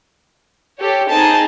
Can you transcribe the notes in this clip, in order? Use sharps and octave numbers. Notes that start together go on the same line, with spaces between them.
G4 A4 C#5
C4 D#4 G#4 A5